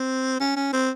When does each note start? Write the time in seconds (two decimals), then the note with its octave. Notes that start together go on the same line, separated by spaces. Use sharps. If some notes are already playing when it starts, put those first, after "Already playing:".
Already playing: C4
0.40 C#4
0.56 C#4
0.73 C4